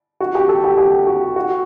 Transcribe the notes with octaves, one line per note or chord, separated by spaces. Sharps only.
F#4
G4
A4
G4
G4
F#4
F#4